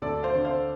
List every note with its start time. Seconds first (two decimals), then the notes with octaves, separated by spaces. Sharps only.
0.02 D2 A4 D5
0.23 C5 F5
0.35 D3
0.45 C5 F5